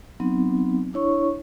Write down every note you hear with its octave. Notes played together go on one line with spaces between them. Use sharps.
F#3 B3 C4 D#4
D4 E4 C#5 C#6